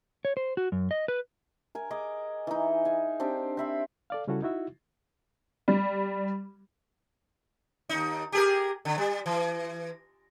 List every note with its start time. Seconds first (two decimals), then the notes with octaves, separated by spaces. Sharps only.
0.25 C#5
0.37 C5
0.57 F#4
0.72 F#2
0.91 D#5
1.08 B4
1.75 A#4 G#5
1.91 G#4 D#5 D6
2.47 E3 D#4
2.85 F5 G#5
3.20 C4 D4 G4
3.57 C4 E5 B5
4.10 A4 D5 F5
4.27 C#3 G3 C#4 E4 F#4 A4
4.42 D#4 E4 F#4 E5
5.68 G3
7.89 D#2 D#4
8.32 G4 G#4 A#4
8.85 D3
8.98 G3
9.26 E3